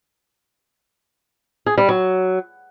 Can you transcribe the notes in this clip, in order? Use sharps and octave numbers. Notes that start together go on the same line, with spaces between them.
G#4
G3
F#3